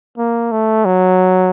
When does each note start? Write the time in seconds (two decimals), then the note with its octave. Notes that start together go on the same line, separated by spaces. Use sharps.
0.18 A#3
0.52 A3
0.85 F#3